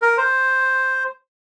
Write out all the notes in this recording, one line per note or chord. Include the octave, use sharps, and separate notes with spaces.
A#4
C5